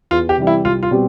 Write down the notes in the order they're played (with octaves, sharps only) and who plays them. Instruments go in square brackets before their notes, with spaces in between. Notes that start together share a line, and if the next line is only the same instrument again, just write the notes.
[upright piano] E2 [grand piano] F4
[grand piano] G4
[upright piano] C3 E3 G3
[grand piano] E4
[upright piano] C2 [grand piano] F4
[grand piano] F4
[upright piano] B2 G3 C4 G4